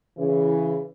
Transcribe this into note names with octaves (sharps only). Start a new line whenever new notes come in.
C#3 E3